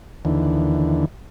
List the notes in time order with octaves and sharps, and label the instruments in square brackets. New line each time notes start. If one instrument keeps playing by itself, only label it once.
[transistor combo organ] D#2 D3 E3